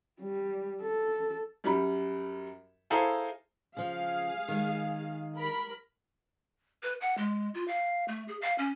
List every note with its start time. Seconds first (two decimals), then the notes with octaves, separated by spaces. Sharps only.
0.21 G3
0.82 A4
1.64 F#2 G3 B5
2.90 E4 G#4 A4 C5 F5 A#5
3.76 C#3 F3 G#4 F5
4.48 D#3 G#3
5.37 A#4 B5
6.83 B4
7.01 F#5
7.17 G#3
7.54 F4
7.68 F5
8.08 A3
8.28 G#4
8.42 F5
8.58 C#4